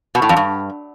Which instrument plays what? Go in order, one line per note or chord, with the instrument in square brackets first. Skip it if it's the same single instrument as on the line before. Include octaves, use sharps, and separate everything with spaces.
[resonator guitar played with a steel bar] B2
A2
F2
G2